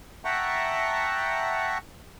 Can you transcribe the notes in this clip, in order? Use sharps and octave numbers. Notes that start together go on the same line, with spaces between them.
E5 F#5 G5 A5 A#5 C#6